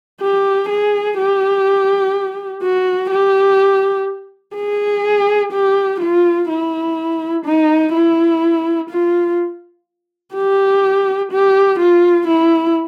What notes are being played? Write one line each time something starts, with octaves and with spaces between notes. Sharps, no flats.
G4
G#4
G4
F#4
G4
G#4
G4
F4
E4
D#4
E4
F4
G4
G4
F4
E4